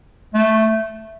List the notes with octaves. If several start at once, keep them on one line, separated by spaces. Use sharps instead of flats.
A3